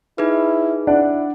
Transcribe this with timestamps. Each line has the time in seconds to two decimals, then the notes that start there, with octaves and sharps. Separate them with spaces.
0.18 D#4 E4 G#4 B4
0.87 D4 E4 D5 F#5